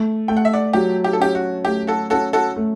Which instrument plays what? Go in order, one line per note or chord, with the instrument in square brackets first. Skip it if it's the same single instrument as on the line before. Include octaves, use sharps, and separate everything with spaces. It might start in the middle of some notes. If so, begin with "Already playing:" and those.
Already playing: [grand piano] A3
[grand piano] A3 [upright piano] G5
[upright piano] F#5
E5
D5 F#5
[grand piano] F#3 [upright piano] G4
[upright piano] G4
A4
[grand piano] C#4 [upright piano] G4
[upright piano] F#4
[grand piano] A3 [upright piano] G4
[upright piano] F#4 A4
[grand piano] C#4 [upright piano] F#4 A4
[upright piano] F#4 A4
[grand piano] A3